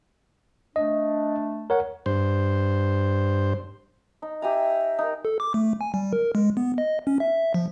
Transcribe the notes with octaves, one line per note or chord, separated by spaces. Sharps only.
A3 D4 D#5
A#4 C#5 F#5
G2 C5
D#4
G4 E5 G#5 A#5
D#4 A#4
A4
D6
A3
G#5
G3
A#4
G#3
B3
D#5
C#4
E5
F3